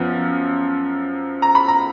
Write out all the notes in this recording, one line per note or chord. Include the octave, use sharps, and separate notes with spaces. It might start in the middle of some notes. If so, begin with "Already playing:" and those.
Already playing: F#2 F3 B3
A#5
B5
A#5